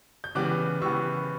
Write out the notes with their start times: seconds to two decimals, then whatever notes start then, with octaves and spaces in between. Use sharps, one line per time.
0.24 G6
0.35 C#3 E3 G3 B3 D6 F#6
0.82 C#3 E3 G3 B3 C#6 E6